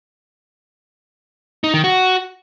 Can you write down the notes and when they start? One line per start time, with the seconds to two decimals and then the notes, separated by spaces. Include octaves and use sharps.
1.64 D#4
1.74 D#3
1.84 F#4